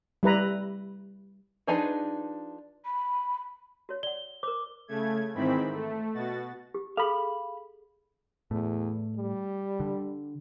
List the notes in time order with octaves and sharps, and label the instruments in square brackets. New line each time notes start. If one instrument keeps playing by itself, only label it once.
[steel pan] G3 E4 B4 A#5
[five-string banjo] F3 D4 D#4 G#4 B4
[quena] B5
[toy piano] F#4 C#5
[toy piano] D5 F#5 [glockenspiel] G7
[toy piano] A#4 C5 [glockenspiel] D6
[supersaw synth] C#3 A3 G#6
G#2 D#3 E3 C4 B5
A3
B2 F#4 A6
[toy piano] G4
[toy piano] G#4 A4 [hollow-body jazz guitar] F5 B5
[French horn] E2 [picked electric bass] A2
[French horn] G3
[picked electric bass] D3